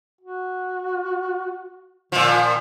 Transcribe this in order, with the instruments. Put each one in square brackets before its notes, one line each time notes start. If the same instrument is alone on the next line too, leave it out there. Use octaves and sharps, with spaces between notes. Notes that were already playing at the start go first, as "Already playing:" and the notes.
[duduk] F#4
[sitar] A#2 F3 [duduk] D#3